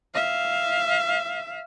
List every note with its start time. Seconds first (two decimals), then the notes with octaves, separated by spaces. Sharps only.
0.15 E5 F5